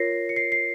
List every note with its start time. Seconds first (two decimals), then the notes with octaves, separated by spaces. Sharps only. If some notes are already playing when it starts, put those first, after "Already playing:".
Already playing: F4 A#4 C#5 A#6 C7
0.29 C#7
0.36 C7
0.52 C7